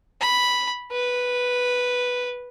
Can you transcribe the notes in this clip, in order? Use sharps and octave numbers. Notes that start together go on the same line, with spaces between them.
B5
B4